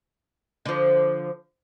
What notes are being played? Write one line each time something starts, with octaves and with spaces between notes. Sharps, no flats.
D3 F3